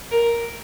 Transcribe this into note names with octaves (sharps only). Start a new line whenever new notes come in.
A#4